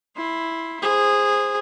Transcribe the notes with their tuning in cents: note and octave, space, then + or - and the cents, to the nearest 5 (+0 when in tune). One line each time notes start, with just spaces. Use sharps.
E4 +0 C6 +10
G#4 -15 C5 +0